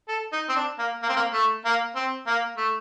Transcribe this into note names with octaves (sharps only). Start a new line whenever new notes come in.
A4
D#4
C4
D4
A#3
A#3
C4
A#3
A3
A#3
C4
A#3
A3